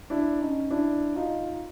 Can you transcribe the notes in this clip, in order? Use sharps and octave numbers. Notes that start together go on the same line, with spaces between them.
D4 E4
C#4 D#4
D4 E4
D#4 F4